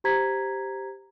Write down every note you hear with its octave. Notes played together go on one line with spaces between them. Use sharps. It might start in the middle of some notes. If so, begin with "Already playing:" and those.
G4 C5 A#5 G#6 B6